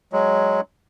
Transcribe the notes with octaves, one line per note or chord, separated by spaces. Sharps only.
F#3 G#3